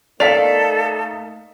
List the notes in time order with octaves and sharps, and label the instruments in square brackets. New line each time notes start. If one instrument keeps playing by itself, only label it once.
[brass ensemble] A3 A#3 D#4 [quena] A4 [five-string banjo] D5 [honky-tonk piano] F5 B6 F7